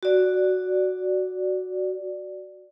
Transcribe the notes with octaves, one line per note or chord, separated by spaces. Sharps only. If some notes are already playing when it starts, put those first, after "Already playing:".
F#4 D5